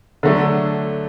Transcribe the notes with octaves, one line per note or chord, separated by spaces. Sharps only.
D3 F#3 A3 D4